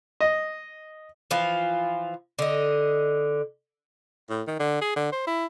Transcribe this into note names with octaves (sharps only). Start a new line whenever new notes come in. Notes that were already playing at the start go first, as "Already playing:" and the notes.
D#5
E3 F3 F4
D3 D#5
A2
D#3
D3
G#4
D3
C5
E4